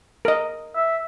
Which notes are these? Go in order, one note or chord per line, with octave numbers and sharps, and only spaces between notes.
A#4 D#5
E5